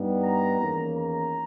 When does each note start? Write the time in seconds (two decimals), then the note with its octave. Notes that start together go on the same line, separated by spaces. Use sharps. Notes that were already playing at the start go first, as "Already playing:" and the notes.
Already playing: G2 G3 B3 D#4
0.23 A#5
0.59 E2 D#3 A#3 C#4
0.96 A#5